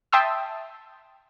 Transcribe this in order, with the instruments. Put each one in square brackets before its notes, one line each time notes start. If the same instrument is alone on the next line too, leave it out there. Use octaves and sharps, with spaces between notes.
[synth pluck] E5 G5 A5 C6 D#6 E6